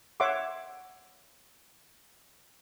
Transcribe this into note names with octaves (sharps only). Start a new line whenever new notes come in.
C#5 E5 F#5 C6 D6